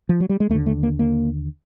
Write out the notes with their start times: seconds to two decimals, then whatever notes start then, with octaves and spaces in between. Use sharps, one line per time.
0.09 F3
0.20 F#3
0.29 G3
0.40 G#3
0.49 D#2 A3
0.54 D3
0.66 A3
0.83 A#3
0.99 A#3